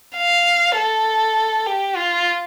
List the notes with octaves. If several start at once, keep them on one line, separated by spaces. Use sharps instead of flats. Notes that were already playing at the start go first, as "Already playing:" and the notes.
F5
A4
G4
F4